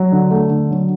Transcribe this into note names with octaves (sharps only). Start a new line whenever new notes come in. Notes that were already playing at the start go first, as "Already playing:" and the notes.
Already playing: F#3
D3
A3
D3
F#3